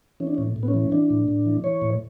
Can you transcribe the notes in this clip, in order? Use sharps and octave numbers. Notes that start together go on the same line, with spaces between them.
E3 C#4
D4
C#4
A2
A2
B3
C#4
E3
E3 D4
A2
A2
E3
E3 C#5
A2